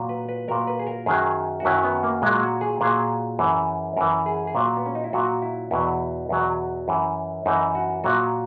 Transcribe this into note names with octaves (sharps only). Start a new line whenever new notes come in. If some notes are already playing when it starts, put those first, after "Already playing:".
Already playing: A#2 F#3
B4
B4
A#2 F#3 A#4
B4
G#4
A#4
F#2 D#3 F#3 G#4
F#4
F#2 D#3 F#3 E4
B3
A#3
A#2 F#3 G#3
F#4
G#4
A#2 F#3 G#4
F#2 E3
F#2 E3 A#4
G#4
G#4
A#2 F#3 F#4
B3
C#4
D#4
E4
A#2 F#3 F#4
E4
E2 B2 F#3 E4
E2 B2 F#3
F#2 E3
F#2 E3 D#4
F#4
A#2 F#3 F#4